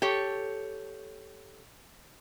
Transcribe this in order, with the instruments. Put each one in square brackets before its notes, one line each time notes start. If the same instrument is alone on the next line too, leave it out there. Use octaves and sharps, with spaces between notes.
[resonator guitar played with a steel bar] G4 A4 C#5